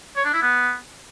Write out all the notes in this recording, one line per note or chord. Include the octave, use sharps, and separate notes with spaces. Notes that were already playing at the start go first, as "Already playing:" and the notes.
C#5
D4
E4
B3